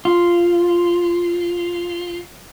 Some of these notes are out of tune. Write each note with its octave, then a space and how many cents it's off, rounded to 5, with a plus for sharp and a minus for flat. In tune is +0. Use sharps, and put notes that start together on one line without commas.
F4 -5